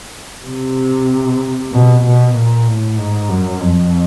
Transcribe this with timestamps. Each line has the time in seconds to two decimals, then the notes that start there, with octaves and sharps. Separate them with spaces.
0.47 C3
1.72 B2
2.03 B2
2.35 A#2
2.67 A2
2.98 G#2
3.29 F#2
3.61 F2